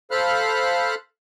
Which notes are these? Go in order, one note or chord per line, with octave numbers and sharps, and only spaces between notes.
A4 C5 F5 B5 F6 F#6